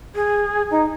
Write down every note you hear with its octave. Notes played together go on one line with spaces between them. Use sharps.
G#4
D#4